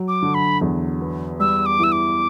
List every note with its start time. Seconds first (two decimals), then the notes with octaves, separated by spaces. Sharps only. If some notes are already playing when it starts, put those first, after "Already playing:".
Already playing: F#3
0.08 D6
0.22 D3
0.34 B5
0.61 E2
1.01 B3
1.40 G3 E6
1.66 D6
1.80 E3 E6
1.92 D6